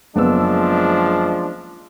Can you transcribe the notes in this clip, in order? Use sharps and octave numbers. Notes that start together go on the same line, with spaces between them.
F#1 F3 G#3 B3 D4 E6